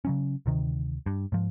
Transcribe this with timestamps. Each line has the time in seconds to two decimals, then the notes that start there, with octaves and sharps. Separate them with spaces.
0.05 C#3 F#3 C#4
0.46 D2 C3 D#3
1.06 G2
1.32 G#2 F3